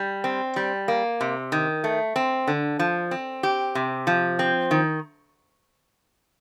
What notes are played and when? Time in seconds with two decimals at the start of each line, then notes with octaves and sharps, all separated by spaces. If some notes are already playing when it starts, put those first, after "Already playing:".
Already playing: G3
0.24 C4
0.56 G3
0.88 A#3
1.21 C3
1.52 D#3
1.84 A3
2.16 C4
2.47 D3
2.79 F3
3.11 C4
3.43 G4
3.75 C3
4.07 F3
4.39 C4
4.71 D#3